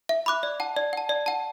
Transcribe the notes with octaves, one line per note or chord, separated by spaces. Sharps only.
E5
B5 D6 F#6
D5
F#5 A5
D5
F#5 A5
D5
F#5 A5